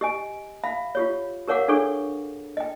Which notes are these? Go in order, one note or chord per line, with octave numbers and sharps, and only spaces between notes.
G4 D#5 G#5
E5 F5 B5
F4 G4 C#5
G4 A#4 C#5 F5 F#5 D6
D4 G#4 A4 C#5 C#6
D#5 G5